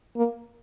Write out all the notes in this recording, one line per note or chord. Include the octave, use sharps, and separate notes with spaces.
A#3